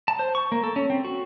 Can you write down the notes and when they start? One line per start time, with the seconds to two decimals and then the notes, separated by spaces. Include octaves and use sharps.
0.08 A5
0.19 C5
0.35 C#6
0.52 A#3
0.64 A4
0.76 C#4
0.90 C4
1.04 F#4